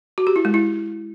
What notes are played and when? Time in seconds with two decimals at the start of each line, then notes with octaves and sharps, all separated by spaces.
0.18 F#4
0.27 G4
0.36 E4
0.45 G#3
0.54 E4